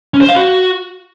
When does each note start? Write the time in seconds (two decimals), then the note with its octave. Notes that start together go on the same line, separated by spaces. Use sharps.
0.14 C#4
0.21 C5
0.29 F5
0.36 F#4